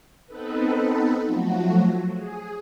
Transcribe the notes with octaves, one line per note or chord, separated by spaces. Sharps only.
B3 C4 D#4 A4 B4
F3 F#3 A3 F#4
G#4